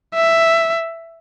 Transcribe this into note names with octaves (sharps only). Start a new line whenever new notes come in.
E5